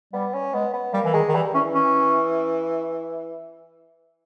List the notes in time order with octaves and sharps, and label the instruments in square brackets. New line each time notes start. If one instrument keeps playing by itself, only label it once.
[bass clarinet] G3 [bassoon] B3
[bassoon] C#4
[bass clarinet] G#3 [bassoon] B3
[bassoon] B3
[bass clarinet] G3 [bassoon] A#3
[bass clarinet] E3
[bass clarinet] D#3 [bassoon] G#3
[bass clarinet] D#3
[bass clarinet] E3 [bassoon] G3
[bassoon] E3 [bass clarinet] C#4
[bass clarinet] C#4